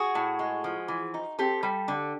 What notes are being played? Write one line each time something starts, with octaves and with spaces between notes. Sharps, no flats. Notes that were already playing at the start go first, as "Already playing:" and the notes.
Already playing: F#4 G#4
A2
G#3
F3
E3
D#4
C4 G4 A4
G3
D3